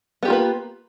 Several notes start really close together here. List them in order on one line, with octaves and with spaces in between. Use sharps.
B3 G4 F4 A#3 B4